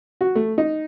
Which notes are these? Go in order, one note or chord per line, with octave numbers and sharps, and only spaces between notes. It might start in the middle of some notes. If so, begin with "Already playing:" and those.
F#4
A3
D#4